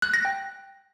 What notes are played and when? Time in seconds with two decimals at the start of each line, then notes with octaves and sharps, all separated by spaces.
0.02 F#6
0.14 A#6
0.25 G5